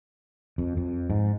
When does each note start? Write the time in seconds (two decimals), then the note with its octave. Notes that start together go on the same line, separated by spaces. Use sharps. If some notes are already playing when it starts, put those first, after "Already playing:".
0.58 F2
0.77 F2
1.10 G#2